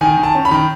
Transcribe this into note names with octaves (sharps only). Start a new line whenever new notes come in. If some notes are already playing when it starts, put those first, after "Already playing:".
D#3 G#5
D#3
A5
C#4
B5
D#3